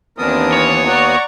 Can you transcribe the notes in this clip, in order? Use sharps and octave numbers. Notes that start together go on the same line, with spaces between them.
D#2 E3 B3 C4 D4 A#4 D#6
C#5
D5 F#5 A#5 C#6